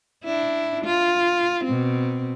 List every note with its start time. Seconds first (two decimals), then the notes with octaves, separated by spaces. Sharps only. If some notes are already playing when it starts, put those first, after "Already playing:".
0.24 D4 E4
0.84 F4
1.64 B2 C4